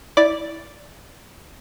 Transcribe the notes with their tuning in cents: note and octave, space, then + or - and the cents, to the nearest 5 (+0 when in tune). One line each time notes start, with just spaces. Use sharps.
E4 -15 D5 +0 D6 +0